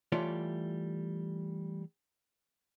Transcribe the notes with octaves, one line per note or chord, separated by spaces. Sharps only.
E3 G3 A3 F4 C#5 D5